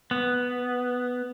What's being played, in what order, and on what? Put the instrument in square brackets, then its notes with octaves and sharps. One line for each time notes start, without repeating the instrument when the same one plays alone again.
[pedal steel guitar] B3